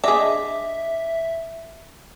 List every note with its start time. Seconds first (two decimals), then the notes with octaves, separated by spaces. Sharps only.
0.04 D4 G#4 D#5 E5 D6